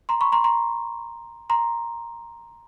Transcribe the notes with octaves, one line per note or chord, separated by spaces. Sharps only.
A#5 C6
B5 C#6
A#5 C6
A#5 C6
A#5 C6